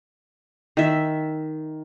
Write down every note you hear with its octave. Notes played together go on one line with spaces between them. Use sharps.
D#3 E5